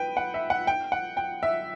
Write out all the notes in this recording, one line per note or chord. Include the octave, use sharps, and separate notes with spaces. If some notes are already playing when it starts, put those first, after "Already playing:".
Already playing: B4 G5
F#5
E5
F#5
G5
F#5
G5
E5